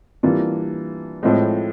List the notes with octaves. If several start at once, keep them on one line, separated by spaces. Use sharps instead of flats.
E3 G3 A#3 D4 F4
A2 F3 G#3 C4